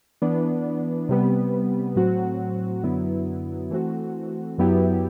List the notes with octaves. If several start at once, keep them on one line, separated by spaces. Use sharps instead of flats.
E3 B3 D4
C3 G3 B3
A2 F#3 C4 F#4
F#2 D3 F#3 B3 E4
E3 A3 C4 F#4
F#2 F#3 B3 E4 G4